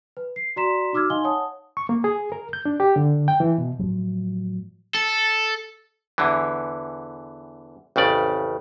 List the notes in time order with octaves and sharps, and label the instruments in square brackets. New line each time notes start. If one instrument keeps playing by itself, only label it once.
[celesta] B4
C7
F#4 D5 A#5 C6 B6 E7
D#4 F#4 D6 E6 F6 G#6
D#4 D#5 F5 G#5 C6 G7
C#5 F#5 A5 D#6
[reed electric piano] C#6
A#3
G#4
A#4
G6
D4
G4
D3
G5
E3
B2
[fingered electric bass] A2 F3 F#3
[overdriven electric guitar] A4
[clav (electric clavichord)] E2 D3 E3
A1 F2 C#3 D5